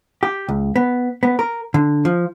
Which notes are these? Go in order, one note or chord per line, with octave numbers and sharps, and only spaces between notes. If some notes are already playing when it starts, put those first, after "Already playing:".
G4
C#2
B3
B3
A#4
D3
F3